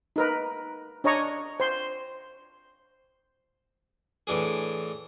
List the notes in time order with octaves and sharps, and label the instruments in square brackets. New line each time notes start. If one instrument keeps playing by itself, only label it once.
[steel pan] D#4 A#4 B4
D4 C#5 D#5 A#5 C#6
C5 C6
[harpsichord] A2 E3 D4 G#4